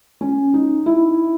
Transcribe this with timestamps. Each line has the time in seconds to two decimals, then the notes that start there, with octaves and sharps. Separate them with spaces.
0.21 C#4
0.54 D#4
0.86 E4